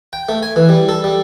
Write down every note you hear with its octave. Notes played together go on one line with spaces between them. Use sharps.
G5
A3
G#5
E3
G3
A4
G3